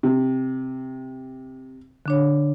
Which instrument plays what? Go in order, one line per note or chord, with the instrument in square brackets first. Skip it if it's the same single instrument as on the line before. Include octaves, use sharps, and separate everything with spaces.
[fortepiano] C3
[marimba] D3 D4 C#5